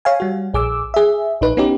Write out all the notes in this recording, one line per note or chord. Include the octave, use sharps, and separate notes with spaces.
C#5 F5 G#5
G3 F#4
A#1 G#4 D6 E6
G#4 E5
A#1 D#4 B4
B3 C#4 D#4 G4